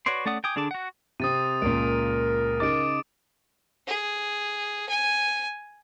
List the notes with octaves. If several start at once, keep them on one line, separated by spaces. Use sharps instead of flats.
F#4 B4 C#5 D5 C6
A3 C#4 D5 F#5 D#6
G5 G#5 D6 D#6
D3 D4 G#4 A5 D6
F#4 F#5
C3 C4 D#6 A6 D#7
C#2 A#2 A#4 D7
C#3 D#4 D6 A6 D7
G#4
G#5